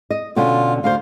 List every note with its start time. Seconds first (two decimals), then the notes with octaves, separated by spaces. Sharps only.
0.11 D#5
0.36 B2 D3 C#4 F4
0.84 D2 C5 F5